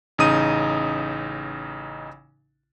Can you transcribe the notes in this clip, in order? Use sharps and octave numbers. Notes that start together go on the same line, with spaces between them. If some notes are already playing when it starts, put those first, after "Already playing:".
A1 C#3 D#4 D#6 D#7